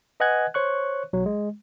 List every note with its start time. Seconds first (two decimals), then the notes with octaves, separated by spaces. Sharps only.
0.20 B4 D#5 F#5 G#5 F#6 G#6
0.54 C5 C#5 C#6 F#6
1.13 B1 F#3
1.26 G#3